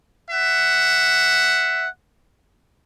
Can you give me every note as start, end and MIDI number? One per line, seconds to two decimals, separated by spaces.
0.31 1.88 76
0.31 1.88 78